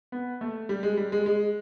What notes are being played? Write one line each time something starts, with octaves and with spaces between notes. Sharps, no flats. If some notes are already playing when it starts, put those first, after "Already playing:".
B3
A3
G3
G#3
G3
G#3
G#3